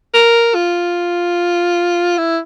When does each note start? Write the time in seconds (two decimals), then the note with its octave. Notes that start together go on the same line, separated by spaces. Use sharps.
0.14 A#4
0.55 F4
2.18 E4